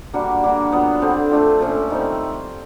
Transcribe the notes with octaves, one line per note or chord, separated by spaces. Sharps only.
G3 A#3 D4 F#4
G3 A#3 D4 F#4
A#2 F#3 B3
D3 G3 C4
A3 D4 F4
A#2 F3 A3 C#4
D#3 G3 C4